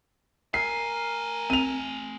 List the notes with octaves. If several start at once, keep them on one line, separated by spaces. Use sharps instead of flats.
A3 A#4 G#5 C7
C4 D#7 F7